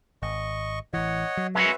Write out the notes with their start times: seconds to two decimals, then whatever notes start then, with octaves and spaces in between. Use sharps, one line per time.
0.23 G#1 D#5 C#6
0.94 A1 E3 C#5 D#5 F#5
1.37 F#3
1.55 G#3 C#4 F#4 B4 E5